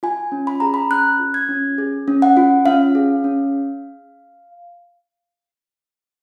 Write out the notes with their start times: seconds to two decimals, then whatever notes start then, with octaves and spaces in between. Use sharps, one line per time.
0.03 F4 G#5
0.32 C#4
0.47 B5
0.60 G#4 A#5
0.74 B5
0.90 C#4 F#6
1.20 F4
1.34 G#6
1.49 C#4
1.78 G#4
2.08 C#4
2.22 F#5
2.37 F4
2.66 C#4 F5
2.95 G#4
3.24 C#4